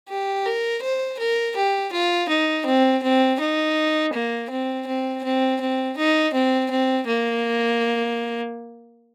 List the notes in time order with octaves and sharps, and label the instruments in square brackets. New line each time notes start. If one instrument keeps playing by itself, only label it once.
[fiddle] G4
A#4
C5
A#4
G4
F4
D#4
C4
C4
D#4
A#3
C4
C4
C4
C4
D#4
C4
C4
A#3